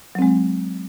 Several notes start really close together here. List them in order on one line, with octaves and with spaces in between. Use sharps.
F#3 C4 G#3